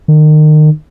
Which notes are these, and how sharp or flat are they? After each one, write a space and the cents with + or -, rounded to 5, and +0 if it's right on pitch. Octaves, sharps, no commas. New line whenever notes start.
D#3 -30